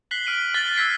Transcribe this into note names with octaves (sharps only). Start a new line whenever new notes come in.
F#6 B6 C7 F#7 G7
F6 B6 D7 D#7 F#7
F6 F#6 A6 B6 D7 G7
E6 F6 G#6 B6 C7